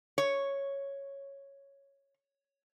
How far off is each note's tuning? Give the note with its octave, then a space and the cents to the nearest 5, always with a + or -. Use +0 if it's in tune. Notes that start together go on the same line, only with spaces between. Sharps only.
C#5 -5